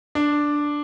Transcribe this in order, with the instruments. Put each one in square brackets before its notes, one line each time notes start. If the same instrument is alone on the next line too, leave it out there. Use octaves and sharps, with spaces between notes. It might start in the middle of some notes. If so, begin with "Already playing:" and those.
[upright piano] D4